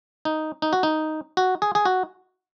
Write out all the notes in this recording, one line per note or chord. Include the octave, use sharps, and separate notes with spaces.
D#4
D#4
F#4
D#4
F#4
G#4
G#4
F#4